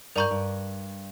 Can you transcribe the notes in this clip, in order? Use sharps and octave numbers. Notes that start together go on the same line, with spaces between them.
G2 A#4 D5 A#5 C#6 G6
G2